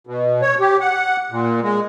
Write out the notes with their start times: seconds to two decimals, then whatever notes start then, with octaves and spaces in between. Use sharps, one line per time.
0.07 B2
0.42 C#5
0.60 G4
0.81 F#5
1.32 A#2
1.63 G#3